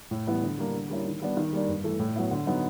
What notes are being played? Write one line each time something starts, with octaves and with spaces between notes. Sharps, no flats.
A2
E3 G3 B3 E4
D3
G3 A#3 D4
D3
G3 A#3 C#4 E4
D#3
G3 B3 D4
D#3
G3 A#3 D4
G2
E3 A3
A2
F#3 B3 E4
D3
F#3 B3 D#4